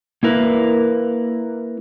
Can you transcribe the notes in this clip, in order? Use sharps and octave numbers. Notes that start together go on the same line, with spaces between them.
A#3 E4 A#4 B4